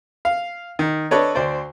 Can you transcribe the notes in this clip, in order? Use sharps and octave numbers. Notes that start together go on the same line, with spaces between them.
F5
D#3
D4 A4 B4 C#5 D#5
D2 C5 D5